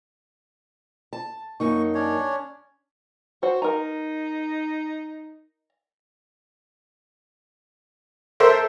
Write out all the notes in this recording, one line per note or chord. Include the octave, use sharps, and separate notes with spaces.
A5
F#2 A#3 D#4 C#6
C#4 D4 C#5
F#4 C5
D#4 A#4 A#5
A4 A#4 C5 E5